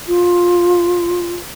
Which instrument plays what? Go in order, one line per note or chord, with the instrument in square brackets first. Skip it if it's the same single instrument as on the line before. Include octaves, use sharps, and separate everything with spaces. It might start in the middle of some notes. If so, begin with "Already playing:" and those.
[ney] F4